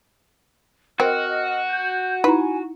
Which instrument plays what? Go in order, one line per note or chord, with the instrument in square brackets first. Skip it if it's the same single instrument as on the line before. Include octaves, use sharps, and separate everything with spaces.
[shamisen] C4 [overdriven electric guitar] F#4 [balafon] A#4 [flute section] D#5 F6
[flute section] G6
[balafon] D#4 E4 A#5 [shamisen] B4 [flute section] G#5